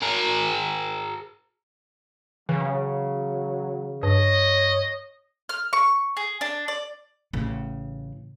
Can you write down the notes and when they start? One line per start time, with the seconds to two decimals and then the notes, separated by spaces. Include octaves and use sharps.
0.02 G#4 A#4
2.49 C#3 E3 F#3
4.03 G2 C#5 D#5
5.49 F6
5.73 C#6
6.17 G#4
6.41 D4
6.68 D5
7.33 A1 C#3